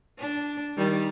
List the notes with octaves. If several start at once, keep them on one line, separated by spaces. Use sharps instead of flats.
D4
D#3 G3